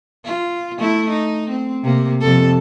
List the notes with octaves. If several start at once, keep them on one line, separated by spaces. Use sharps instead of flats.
F4
A3 E4
D#4
C4
C3 A#3
F2 C3 A4